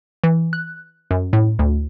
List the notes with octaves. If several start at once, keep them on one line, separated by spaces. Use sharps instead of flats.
E3
F#6
F#2
A2
D2